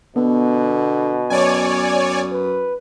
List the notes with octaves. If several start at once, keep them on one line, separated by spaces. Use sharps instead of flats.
B2 D3 B3
F#2 C#5 D5 G#5
B4